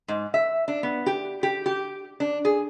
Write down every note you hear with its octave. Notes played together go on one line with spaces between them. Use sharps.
G#2
E5
D4
B3
G4
G4
G4
D4
G#4